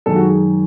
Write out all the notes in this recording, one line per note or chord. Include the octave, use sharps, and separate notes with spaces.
F#2 D#3 G#3 A4
F#4
G#4